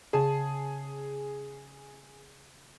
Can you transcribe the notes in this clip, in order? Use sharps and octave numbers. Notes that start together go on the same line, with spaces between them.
C#3 G#4 A5